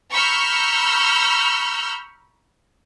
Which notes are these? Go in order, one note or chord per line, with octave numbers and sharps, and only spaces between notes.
A#5 B5 C#6 E6 F6 G6